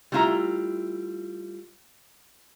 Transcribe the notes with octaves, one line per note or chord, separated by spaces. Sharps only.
G3 A3 E4 F4 F5 A#5